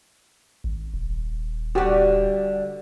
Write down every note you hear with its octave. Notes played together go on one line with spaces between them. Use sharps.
G#1
D#1
D3 G3 F#4 G4